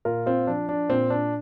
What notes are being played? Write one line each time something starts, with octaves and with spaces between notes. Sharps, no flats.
A#2 F4 A#4
C4 F4
F3 D4
D4
A#2 C4
D4